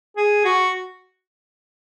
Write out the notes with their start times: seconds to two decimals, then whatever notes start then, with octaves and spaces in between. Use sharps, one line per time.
0.17 G#4
0.45 F#4